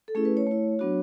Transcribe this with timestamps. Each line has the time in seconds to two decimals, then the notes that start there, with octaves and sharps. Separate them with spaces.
0.08 A4
0.15 A3 C#4 E4 G#4
0.25 B4
0.37 C#5
0.47 A3 E4
0.79 F#3 B3 D4 F#4